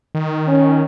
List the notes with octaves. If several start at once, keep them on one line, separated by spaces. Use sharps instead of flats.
D#3
C#4